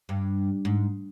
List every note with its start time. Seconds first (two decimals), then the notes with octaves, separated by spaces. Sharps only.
0.09 G2
0.65 G#2